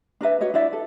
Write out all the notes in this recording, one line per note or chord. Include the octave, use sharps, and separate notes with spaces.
D4 A#4 B4 E5
F#4 B4 C#5 D#5
D4 E4 D5 E5
A4